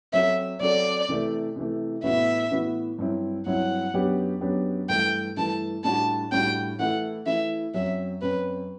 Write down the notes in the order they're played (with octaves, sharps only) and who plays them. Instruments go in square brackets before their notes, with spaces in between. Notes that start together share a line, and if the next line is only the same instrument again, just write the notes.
[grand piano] F#3 C4 F#4 A4 [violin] E5
[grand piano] F#3 C4 F#4 A4 [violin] D5
[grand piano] C3 E3 A3
C3 E3 A3
[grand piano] A2 E3 B3 F#4 [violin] E5
[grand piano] A2 E3 B3 F#4
G2 F#3 C4 E4
[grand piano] G2 F#3 C4 E4 [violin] F#5
[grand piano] F#2 F#3 B3 D4 G4
F#2 F#3 B3 D4 G4
[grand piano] G2 E3 A3 [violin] G5
[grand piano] G2 E3 A3 [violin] A5
[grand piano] A2 G3 D4 F#4 [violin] A5
[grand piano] A2 G3 D4 F#4 [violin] G5
[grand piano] E3 A3 E4 [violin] F#5
[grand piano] E3 A3 E4 [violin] E5
[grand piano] F#2 F#3 C4 [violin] E5
[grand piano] F#2 F#3 C4 [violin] B4